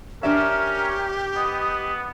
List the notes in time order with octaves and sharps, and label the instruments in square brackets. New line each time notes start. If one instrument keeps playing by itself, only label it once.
[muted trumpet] C#4 [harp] D4 D5 E5 [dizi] G4 [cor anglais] A#4
[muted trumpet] B3 [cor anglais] D#5